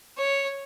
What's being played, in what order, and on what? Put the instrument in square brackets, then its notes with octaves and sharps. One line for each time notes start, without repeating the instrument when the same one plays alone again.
[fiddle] C#5